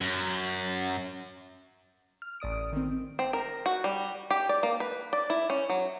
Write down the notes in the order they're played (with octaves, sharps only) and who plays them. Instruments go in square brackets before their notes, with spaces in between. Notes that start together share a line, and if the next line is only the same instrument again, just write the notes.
[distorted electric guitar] F#2
[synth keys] F6
A1 D5 D#6 D7
D#3 C4
[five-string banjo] C4
A#4
F#4
G3
G4
D5
A#3
B4
D5
E4
C#4
F#3